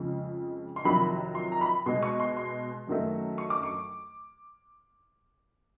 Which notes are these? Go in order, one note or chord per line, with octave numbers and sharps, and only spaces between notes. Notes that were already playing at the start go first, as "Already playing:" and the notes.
Already playing: F2 C#3 F3 G#3
C6
F2 C3 D#3 F#3 B5
C6
A#5
B5
B2 G#3 C6
C#6
C6
C6
F#2 D#3 F#3 A3
C#6
D6
C#6